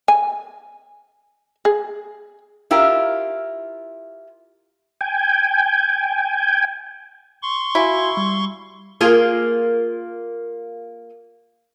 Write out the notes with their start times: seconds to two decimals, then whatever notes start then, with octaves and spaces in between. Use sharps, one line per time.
0.08 G#5
1.65 G#4
2.71 E4 F4 G4 A#4
5.01 G5 G#5
7.42 C6 C#6
7.75 E4 F#4 F5 G#5
8.17 G3
9.01 A#3 F4 G#4